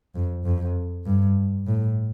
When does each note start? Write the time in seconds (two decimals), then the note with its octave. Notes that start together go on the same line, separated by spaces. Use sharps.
0.15 F2
0.45 F2
1.05 G2
1.67 A2